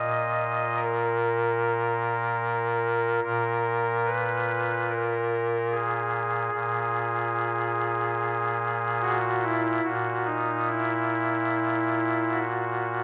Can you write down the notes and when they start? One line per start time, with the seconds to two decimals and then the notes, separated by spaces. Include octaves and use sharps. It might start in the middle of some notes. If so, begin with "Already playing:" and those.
Already playing: A#2 D#5
0.76 A#4
3.24 A#2 A#4
4.06 B4
4.89 A#4
5.71 G#4
6.54 A#2
9.02 F#4
9.43 E4
9.84 A#2 F#4
10.25 D#4
10.67 E4
12.31 F#4